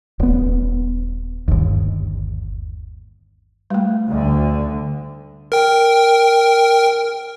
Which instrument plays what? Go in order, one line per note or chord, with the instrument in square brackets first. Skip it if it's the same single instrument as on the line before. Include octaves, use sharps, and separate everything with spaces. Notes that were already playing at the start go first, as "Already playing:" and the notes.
[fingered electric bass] D#1 B3
G1 D#2
[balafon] G3 A3
[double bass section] D2 D3
[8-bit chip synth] A#4 G5